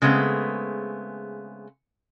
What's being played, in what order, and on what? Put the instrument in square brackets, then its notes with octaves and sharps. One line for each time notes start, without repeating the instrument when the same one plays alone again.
[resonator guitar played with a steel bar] C#3 G#3 A3 B3 C4